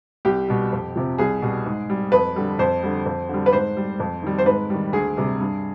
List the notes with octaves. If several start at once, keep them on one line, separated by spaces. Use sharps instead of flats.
C2 G4
B2 G3
F2
C3 F3
C2 G#4
B2 G3
G#2
G3
F2 B4
D3 G3
F2 C5
D3 G3
F2
D3 G3
B4
G#2 C5
G3
F2
D#3 G3
C5
G#2 B4
D#3 G3
D2 G#4
C3 G3
G2